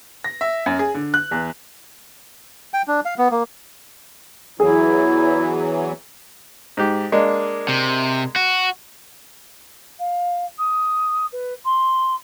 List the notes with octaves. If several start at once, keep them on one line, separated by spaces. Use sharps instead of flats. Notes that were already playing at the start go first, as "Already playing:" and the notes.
A#6
E5
F#2
G#4
D3
F#6
E2
G5
D4
F5
B3
A#3
E2 E3 F#3 E4 G#4
G#2 G4
G#3 A#3 D4
C3
F#4
F5
D#6
B4
C6